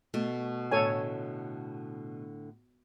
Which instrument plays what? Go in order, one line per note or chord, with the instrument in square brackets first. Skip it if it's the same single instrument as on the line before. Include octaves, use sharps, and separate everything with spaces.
[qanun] B2 [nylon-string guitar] A3
[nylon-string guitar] A2 D3 [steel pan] A4 C#5 G#5